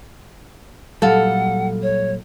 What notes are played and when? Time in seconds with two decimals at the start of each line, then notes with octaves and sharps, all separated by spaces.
1.02 A#2 F#3 G3 A4 F5 F#5
1.82 C#5